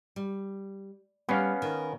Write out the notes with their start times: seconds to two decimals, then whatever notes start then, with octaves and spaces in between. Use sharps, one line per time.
0.16 G3
1.29 G3 B3 C#4 F5
1.62 D#3